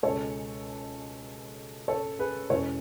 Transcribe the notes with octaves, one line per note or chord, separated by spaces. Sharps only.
C#2 B2 G#3 A4 C#5
A4 C#5
G#4 B4
E2 B2 G#3 C#4 A4 C#5